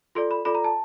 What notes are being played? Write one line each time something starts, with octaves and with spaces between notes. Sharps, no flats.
F4 A4 D5 C6
B5
F4 A4 D5 B5
A#5
A5